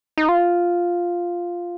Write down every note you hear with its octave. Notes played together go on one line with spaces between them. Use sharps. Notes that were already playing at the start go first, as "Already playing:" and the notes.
D#4
F4